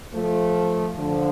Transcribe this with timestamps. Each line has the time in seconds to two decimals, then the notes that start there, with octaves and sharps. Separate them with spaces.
0.14 F3 A3
0.98 D3 F3